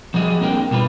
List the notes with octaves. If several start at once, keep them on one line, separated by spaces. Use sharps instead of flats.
F3 G3 F#4 G#4 D#5
A#3 C4 D4 A#4 G5
B2 G3 F4 B4